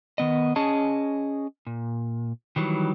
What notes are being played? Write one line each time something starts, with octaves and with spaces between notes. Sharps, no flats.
D#3 B3 D#5
C#4 G#4 D#5 A5
A#2
D#3 E3 F#3 G3